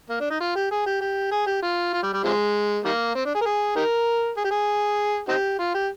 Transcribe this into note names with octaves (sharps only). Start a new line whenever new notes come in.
A#3
D4
D#4
F4
G4
G#4
G4
G4
G#4
G4
F4
F4
G3
G3
C3 F3 G#3
D#3 G3 A#3
C4
D4
G#4
A#4
G#4
D#4 G4 A#4
G#4
G4
G#4
C4 D#4 G4
F4
G4